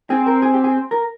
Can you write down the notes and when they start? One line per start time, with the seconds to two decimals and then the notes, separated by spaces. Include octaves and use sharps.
0.10 C4 G#4
0.27 A#4
0.42 G#4
0.54 G4
0.64 G#4
0.91 A#4